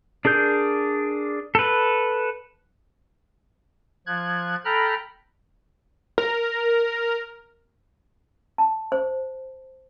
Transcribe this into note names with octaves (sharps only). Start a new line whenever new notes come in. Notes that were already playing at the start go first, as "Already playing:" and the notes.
D4 G#4 A#4 G6
A4 B4
F3 F#6 G#6
A4 G5 A#5 B5 F6 F#6
A#4
A5
C5